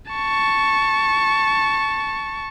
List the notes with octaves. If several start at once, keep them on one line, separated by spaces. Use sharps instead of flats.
A5 C#6